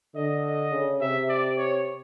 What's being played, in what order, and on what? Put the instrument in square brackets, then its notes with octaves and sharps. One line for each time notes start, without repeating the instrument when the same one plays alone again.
[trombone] D3 [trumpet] D#5
[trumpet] D#5
[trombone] C#3
[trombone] C3 [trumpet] E5
[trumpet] D5
C#5